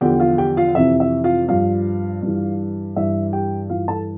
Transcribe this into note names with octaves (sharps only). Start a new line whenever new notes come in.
E2 D3 F3 G4 G5
F4 F5
G4 G5
F4 F5
F2 C3 E3 E5
E5
F4 F5
G2 F3 F4 F5
G2 E3
G2 E3 E5
G4 G5
G2 E3 F4 F5
A4 A5